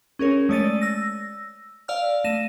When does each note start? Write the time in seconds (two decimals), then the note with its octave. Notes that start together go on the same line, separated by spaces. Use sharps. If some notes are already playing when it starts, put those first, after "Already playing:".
0.19 C#4 G#4 A#4 C#5
0.49 G#3 A3 C#5 D5 A6 D#7
0.81 E6 A#6
1.88 D5 F5 E6 F6
2.24 A3 A#6 D#7 E7